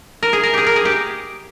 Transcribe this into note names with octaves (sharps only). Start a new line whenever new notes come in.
A#4
G#4
A#4
G4 G#4
A#4
G#4
G4